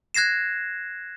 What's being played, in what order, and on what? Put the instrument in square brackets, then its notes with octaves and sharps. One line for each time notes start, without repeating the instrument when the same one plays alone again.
[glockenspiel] F#6 G#6 A#6 C7 E7